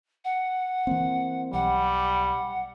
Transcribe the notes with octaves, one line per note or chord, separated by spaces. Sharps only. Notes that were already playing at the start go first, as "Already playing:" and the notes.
F#5
E3 A#3 C4
B1 G3 F#5